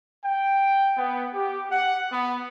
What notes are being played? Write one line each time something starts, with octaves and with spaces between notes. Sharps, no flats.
G5
B3
G4
F#5
B3